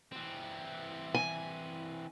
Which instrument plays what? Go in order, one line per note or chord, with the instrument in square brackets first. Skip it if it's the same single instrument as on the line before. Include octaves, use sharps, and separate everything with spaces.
[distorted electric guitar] E3 C4
[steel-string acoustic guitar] G#5